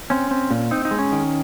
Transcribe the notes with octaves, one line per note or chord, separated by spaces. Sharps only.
C4 C#4
C4
A#2
C4 D#4
D#4
G#3
C#4
D#3